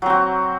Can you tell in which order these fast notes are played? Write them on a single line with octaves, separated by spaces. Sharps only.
F#3 C4 F#4